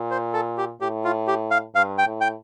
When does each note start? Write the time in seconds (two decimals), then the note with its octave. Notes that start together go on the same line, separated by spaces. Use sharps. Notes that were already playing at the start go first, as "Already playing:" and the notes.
Already playing: A#2
0.11 C5
0.34 A4
0.58 G4
0.80 A2 G4
1.05 F4
1.27 G4
1.51 F5
1.75 G2 F5
1.98 G5
2.06 A2
2.21 G5